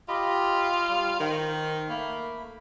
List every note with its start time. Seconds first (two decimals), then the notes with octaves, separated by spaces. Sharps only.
0.09 F4 G4 D#5 B5
0.89 G3
1.20 D#3 C5
1.90 A3 A#3 B5